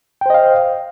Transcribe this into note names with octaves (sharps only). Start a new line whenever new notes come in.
C5 D#5 F5 G5